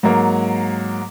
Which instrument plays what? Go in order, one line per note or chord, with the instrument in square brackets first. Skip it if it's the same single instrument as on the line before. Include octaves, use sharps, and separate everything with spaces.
[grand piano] G#2 F#3 A#3